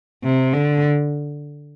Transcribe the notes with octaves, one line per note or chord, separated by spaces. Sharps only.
C3
D3